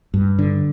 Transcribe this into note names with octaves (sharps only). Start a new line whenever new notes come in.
G2
D3